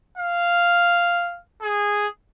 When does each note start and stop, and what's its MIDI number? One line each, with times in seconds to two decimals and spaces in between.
0.17 1.39 77
1.62 2.07 68